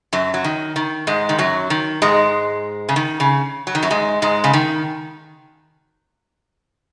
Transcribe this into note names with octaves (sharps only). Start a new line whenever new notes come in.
F#2 F#3
F#3
D#3
D#3
G#2 G#3
D#3
F#2 F#3
D#3
G#2 G#3
C#3
D#3
C#3
F#3
D#3
F#2 F#3
G#2 G#3
G#2 G#3
C#3
D#3